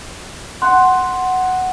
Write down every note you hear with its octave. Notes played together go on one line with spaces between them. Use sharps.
F#5 C6